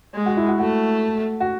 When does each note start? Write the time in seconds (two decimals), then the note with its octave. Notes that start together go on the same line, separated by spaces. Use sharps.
0.14 G#3
0.26 F#4
0.37 E4
0.48 F#4
0.59 A3 F#4
1.40 F#4